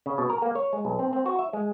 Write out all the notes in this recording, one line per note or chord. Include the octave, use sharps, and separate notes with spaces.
C#3
B2
A#4
A#3
C#5
G#3
B1
C4
C4
F#4
E5
G#3